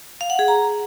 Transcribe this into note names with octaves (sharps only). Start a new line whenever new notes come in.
F5
F#5
G#4
A#5